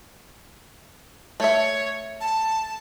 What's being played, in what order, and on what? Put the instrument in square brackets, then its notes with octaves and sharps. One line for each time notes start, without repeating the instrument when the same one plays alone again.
[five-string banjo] A3 E5 [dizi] C#5
[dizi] A5